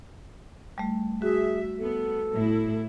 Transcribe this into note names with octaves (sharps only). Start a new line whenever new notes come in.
G3 A3
F#4 G#4 E5
B3 A4
A2 E4